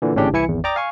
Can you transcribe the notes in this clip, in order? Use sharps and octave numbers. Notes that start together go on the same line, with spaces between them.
A#2 D3 E3
G#1 A2 C#3 C#4 D4 G4
C2 E3 E4 G#5 C#7
G#1 E2
D5 G5 A#5 D6 D#6
F5 G#5 C#6